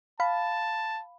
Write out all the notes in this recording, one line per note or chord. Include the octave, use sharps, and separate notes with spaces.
F5 A5 B5